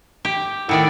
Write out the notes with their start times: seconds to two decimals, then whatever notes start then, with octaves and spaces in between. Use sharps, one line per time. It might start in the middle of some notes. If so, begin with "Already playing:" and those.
0.25 G4
0.69 A2 D#3 E4 D5 F#5 G5